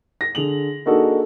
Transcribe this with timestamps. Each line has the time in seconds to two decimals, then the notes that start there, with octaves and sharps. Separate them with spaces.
0.21 A#6
0.35 D3 G#4 F7 F#7
0.86 A#3 D4 D#4 F#4 G#4 A4